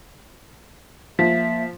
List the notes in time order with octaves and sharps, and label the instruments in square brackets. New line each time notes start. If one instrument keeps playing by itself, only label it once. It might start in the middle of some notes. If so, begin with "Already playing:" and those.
[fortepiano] F3 [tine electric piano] A#3 [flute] E5 [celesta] B6